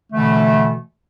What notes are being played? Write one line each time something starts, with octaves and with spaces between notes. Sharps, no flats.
B2 D3 E3 A3